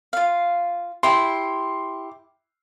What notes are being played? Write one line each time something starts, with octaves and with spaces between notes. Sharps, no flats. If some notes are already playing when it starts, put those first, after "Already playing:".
F4 F5
E4 G4 G5 C6